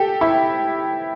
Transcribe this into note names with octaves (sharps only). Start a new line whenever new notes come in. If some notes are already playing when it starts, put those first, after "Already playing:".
Already playing: G4 A4
E4